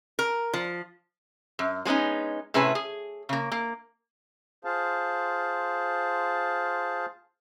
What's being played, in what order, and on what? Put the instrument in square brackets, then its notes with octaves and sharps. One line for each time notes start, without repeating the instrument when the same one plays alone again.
[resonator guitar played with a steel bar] A#4
F3
F#2
F#3 G#3 B3 C#4 D#4
A2 C3 C#4 G#4 B4 A5
G#4
C#3 A#3
A#3
[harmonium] F4 G#4 C5 F5 A5